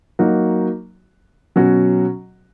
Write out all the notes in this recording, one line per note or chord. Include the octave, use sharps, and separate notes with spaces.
F#3 A#3 D#4 F#4
B2 F#3 C#4 F#4